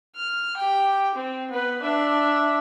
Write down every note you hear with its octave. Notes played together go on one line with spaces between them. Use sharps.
F6
G4 G5
C4
B3 B4
D4 E5